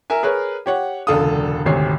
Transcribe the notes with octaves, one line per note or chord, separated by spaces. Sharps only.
A#4 E5 G#5
G#4 A#4 B4 C#5
G4 C#5 F#5
E1 C#2 D3 A4 F5 D#6
G#1 D2 C3 C#5 C7